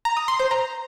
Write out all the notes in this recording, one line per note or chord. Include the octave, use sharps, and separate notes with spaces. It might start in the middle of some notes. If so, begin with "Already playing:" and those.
A#5
D#6
C6
C5
A#5